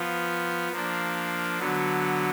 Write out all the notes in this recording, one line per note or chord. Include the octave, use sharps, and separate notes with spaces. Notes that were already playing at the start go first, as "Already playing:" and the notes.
Already playing: F3 B3 F4
F3 A#3 D4
D3 F#3 B3